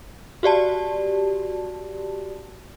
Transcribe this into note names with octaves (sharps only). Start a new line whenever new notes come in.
F#4 G4 D5 A5